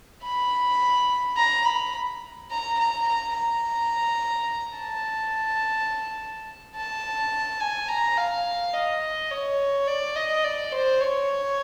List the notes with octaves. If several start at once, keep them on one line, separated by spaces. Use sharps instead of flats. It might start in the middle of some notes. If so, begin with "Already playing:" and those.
B5
A#5
B5
A#5
A#5
A#5
A#5
A5
A5
G#5
A#5
F5
D#5
C#5
D5
D#5
D5
C5
C#5